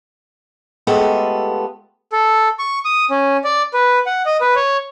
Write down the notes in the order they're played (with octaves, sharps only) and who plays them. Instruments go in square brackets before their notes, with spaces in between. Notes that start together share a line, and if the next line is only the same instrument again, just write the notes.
[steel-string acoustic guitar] G#3 A3 B3 F4 G4 A4
[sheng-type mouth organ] A4
C#6
D#6
C#4
D5
B4
F#5
D#5
B4
C#5